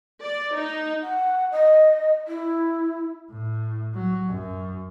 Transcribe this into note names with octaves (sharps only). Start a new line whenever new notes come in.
D5
D#4
F#5
D#5
E4
A2
F#3
F#2